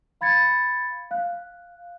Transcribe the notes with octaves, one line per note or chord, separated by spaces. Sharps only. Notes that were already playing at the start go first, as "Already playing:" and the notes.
F5 B5 G#6 A6 C#7
F5 F#6